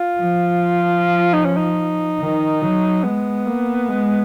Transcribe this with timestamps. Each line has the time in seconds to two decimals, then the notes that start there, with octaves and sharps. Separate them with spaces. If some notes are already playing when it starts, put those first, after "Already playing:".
Already playing: F4
0.19 F3
1.33 D#4
1.45 C#4
1.57 D#4
2.19 D#3
2.62 F#3
3.04 G#3 B3
3.46 A#3
3.89 G#3